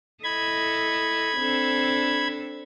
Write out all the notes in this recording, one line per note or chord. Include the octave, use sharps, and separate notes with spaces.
E4 A4 D#5 B5 G#6
C4 D4 A4